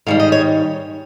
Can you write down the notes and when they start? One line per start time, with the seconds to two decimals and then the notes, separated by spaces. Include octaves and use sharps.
0.06 G#2 D#3 G3 F5
0.20 D#5
0.32 C#5